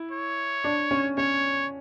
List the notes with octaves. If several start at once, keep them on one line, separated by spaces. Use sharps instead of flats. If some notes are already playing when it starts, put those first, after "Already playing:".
Already playing: E4
C#5
D4
C#4
C#4 C#5